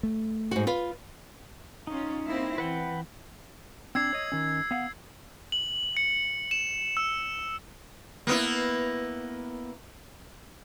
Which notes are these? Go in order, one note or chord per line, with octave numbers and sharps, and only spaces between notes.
A3
G#2 F#4
F4 B4
C#4 D#4 F4
A#3 C4 E4
E3 B4 F#5 G5
C4 D4 E6 G#6 C7
C#5 D#5
D#3 C#4
B3 F5 F#5
F#7
C#7
E7
E6
A#3 B3 E4